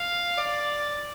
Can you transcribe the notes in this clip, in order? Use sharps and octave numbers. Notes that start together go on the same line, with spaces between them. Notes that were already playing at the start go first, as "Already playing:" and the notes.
Already playing: F5
D5